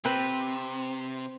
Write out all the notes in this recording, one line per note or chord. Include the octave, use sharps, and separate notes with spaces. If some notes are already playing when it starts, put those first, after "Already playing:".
C3 C4 B4